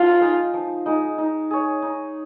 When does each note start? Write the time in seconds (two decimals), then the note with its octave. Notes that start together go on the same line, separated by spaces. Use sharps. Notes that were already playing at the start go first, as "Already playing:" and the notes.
Already playing: F3 F4
0.21 G#3 D#4
0.54 F3
0.86 G#3 D#4
1.18 D#4
1.51 G#4 C#5
1.82 D#4